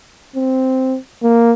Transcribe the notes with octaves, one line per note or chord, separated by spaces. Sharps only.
C4
A#3